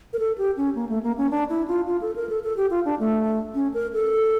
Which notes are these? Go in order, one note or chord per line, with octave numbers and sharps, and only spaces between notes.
A#4
A4
G4
C#4
A#3
A3
A#3
C#4
D4
E4
F4
F4
A4
A#4
A4
A4
G4
F4
D4
A3
C#4
A#4
A4